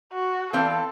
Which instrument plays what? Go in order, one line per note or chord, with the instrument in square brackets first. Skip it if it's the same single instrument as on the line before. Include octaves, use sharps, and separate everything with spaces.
[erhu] F#4
[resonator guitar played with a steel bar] E3 C4 F5 [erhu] A4